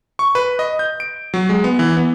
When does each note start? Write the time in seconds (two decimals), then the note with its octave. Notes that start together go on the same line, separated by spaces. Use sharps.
0.19 C#6
0.35 B4
0.59 D#5
0.79 G6
1.00 D7
1.34 F#3
1.49 G#3
1.64 B3
1.79 E3
1.97 B3